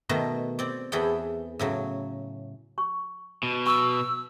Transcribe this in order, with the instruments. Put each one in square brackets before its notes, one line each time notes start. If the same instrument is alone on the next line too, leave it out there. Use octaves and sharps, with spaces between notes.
[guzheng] B2 D#3 A3
C4 D5
E2 E3 G#4 A4 F#5 G5
A2 C#3 F#3
[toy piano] C#6
[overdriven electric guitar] B2
[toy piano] C#6 [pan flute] E6